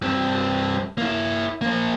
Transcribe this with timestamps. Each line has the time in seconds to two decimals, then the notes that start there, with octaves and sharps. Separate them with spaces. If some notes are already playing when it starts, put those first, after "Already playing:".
0.02 G2 C4
0.98 A#3 E4
1.61 A#3 C5